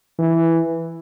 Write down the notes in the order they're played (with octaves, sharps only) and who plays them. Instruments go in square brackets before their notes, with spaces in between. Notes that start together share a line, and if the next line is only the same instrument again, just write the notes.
[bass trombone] E3